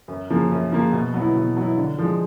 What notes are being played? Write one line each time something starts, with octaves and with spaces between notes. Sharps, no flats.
F#2
C#3 F3 A#3
F#2
C#3 F3 A#3
B2
F#3 B3 E4
B2
F#3 B3 E4
D3
F3 G#3